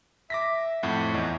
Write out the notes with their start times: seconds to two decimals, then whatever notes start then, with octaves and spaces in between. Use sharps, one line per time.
0.30 E5 D6 A#6 B6
0.83 F2 A2 F#5
1.14 E2 C#5 D#5 E5